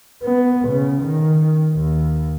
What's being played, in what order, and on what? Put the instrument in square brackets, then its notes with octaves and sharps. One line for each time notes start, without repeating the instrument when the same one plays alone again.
[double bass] B3
C#3
D#3
D#2